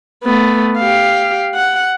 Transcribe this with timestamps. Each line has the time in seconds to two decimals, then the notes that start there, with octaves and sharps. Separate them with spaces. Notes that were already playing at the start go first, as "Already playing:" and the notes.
0.24 A3 B3
0.78 G4 F5
1.55 F#5